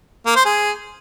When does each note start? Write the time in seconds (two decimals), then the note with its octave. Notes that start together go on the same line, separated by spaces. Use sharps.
0.26 A#3
0.36 C5
0.45 G#4